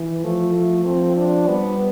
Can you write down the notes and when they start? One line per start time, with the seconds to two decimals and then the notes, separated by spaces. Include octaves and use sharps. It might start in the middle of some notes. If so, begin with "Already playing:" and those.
Already playing: E3
0.24 F3 A3
0.55 A3
0.85 F3 C4
1.17 D4
1.48 G3 B3